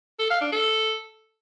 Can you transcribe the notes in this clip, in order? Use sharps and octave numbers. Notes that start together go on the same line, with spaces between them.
A4
F5
D4
A4